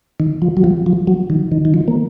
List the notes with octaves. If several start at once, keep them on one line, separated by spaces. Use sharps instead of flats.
D#3
F3
F#3
F3
F3
F#3
D#3
D#3
D#3
F3
A#3